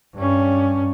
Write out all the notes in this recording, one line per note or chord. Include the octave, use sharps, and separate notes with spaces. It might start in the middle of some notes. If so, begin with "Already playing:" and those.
G2 C#4